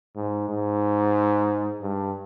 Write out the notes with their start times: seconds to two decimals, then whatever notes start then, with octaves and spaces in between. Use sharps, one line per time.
0.16 G#2
0.49 G#2
1.81 G2